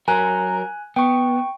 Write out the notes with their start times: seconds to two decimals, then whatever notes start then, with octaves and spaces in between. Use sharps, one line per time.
0.08 F#3 A#4 G#5 F#6
0.96 B3 G5 C#6